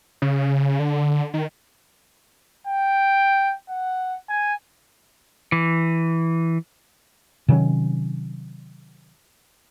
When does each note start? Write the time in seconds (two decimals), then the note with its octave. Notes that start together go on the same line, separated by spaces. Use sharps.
0.22 C#3
0.79 D3
1.34 D#3
2.67 G5
3.70 F#5
4.29 G#5
5.52 E3
7.48 C3 D#3 F#3 C#4